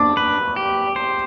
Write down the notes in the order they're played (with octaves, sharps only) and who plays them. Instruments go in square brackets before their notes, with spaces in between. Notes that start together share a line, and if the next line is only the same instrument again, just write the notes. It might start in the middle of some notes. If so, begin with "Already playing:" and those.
Already playing: [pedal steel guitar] D4 [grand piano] D6
[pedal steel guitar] B4
G4
C5